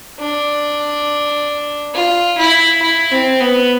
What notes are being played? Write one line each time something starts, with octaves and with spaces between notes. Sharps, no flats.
D4
F4
E4
E4
C4
B3